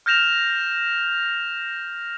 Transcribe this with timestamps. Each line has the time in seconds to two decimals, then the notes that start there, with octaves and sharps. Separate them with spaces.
0.06 F6 G6 A#6 E7 F7